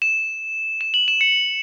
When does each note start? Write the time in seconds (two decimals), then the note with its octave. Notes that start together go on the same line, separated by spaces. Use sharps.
0.02 E7
0.81 E7
0.94 F#7
1.08 E7
1.21 C#7